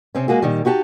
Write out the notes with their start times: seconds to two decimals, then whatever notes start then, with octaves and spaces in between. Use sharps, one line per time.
0.15 C3 C4 C#4
0.28 G#3 A#3 F#4 G#4
0.42 A#2 D#3 G3
0.65 D#4 F#4 G4 G#5 A5